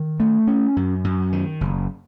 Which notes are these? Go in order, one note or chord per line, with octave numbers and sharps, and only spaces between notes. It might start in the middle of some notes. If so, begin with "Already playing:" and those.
Already playing: D#3
A3
C#4
F#2
F#2
D#3
F#1